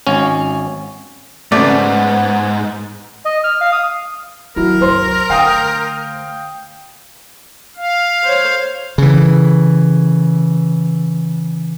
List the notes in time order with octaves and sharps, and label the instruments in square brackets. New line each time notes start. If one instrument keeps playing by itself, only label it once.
[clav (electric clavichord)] G#1 C#4
[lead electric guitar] G#2 [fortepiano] C#3 A3 [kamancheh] B3 [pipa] D5
[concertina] D#5
F6
F5
D#6
[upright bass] D#3 F#3 [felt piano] E4 F#4 [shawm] A#4
[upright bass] C2 F#2 [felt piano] C5 C6
[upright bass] D3 A3 [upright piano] F5 G5 D#6
[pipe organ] F5
[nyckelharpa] C5 C#5
[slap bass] C#3 E3